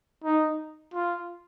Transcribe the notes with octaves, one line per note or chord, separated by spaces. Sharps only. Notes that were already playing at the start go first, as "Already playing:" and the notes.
D#4
F4